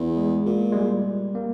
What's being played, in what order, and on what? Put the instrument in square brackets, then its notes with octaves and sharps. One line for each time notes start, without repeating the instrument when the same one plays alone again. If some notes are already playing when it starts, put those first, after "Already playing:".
Already playing: [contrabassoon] E2
[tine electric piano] G#3
[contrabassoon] A#2
[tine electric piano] G#3
G3
A#3